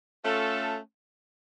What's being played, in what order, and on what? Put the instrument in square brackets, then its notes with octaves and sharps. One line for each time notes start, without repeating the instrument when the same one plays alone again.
[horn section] A3 C#4 F4 A4